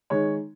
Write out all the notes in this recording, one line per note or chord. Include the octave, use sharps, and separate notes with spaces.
D#3 G#3 C#5